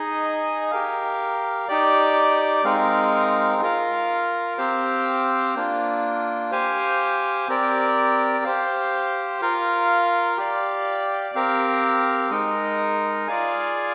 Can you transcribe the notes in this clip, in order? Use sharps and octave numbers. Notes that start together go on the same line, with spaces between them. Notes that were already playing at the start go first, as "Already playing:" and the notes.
Already playing: D#4 G#4 D#5 G#5
G4 A#4 F5
D#4 G4 D5
G#3 C4 D#4 A#4 F5
F4 A#4 F5
C4 G4 C5 F5
A#3 D4 F4
G4 C5 F5 G#5
C4 G4 A#4 D5
G4 C5 F5
F4 A#4 F5
G4 D5 F5
C4 G4 A#4 F5
G#3 D#4 A#4 D#5
F4 G#4 D5 F5 G#5